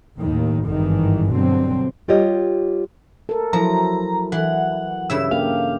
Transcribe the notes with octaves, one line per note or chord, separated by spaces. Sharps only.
D#2 A2 D#3
G#1 G2 D#3 E3
G2 B2 D3 F#3 C4
G3 F4 G4 C#5 D#5
A4 A#4
F3 F#3 E4 A#5
E3 F#5
G2 C#3 E4 E6
A#3 G4 A4 F5